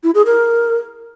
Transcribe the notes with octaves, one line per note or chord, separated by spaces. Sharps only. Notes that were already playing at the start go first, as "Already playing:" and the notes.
E4
G#4
A#4